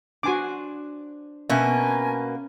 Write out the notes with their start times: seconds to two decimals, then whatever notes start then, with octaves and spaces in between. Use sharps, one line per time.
0.23 D4 F#4 C5 G#5 D6
1.50 B2 A#3 C#4 E5 G#5 A5